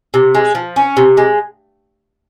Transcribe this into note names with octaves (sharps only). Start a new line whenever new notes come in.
C3
G#3
F3
C#4
C3
G#3